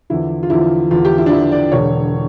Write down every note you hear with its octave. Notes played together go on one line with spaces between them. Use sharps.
E2 D3 F3 E4
F4
E2 D3 F3 E4
E2 D3 F3 F4
G4
E4
D4
E2 D3 F3 E4
D5
E1 E2 D3 C#5